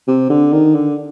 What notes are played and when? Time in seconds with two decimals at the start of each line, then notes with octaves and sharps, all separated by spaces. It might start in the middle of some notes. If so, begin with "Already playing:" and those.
0.08 C3
0.30 D3
0.53 D#3
0.75 D3